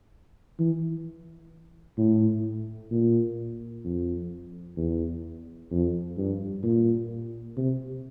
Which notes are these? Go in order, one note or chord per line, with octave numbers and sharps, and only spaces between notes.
E3
A2
A#2
F2
E2
F2
G2
A#2
C3